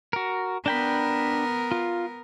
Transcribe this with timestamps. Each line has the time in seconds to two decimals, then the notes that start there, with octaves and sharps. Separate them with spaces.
0.13 F#4 A#4
0.66 B3 D4 A#4 G5 B5
1.72 F4